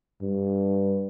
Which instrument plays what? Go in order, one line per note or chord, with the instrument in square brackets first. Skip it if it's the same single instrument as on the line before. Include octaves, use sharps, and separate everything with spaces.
[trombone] G2